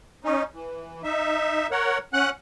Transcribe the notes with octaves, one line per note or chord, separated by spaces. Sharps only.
C#4 D#4
E3
D#4 E5
A#4 C#5 F#5
C#4 F#5 F#6